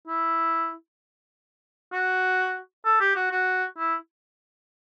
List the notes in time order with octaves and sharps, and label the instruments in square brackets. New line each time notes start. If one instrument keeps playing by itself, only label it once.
[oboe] E4
F#4
A4
G4
F#4
F#4
E4